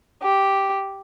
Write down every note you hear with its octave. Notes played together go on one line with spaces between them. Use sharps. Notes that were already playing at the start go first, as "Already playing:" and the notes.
G4